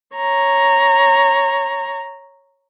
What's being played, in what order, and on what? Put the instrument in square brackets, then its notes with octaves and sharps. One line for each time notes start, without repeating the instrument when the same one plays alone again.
[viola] C#5 A#5